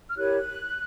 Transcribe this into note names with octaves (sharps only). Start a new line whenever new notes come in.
F6
E4 G4 A#4 C#5 F#6